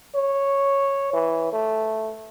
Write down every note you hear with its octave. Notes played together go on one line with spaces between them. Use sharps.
C#5
E3
A3